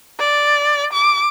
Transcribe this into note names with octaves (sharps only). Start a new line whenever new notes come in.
D5
D6